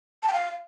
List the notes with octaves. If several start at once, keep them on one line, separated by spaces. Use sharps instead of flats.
A5
G5
F5